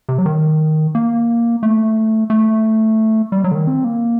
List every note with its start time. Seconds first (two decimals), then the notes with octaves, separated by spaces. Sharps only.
0.09 C3
0.18 F#3
0.26 D#3
0.95 A#3
1.63 A3
2.30 A3
3.32 G3
3.44 F#3
3.51 D3
3.55 D#3
3.67 C4
3.84 A#3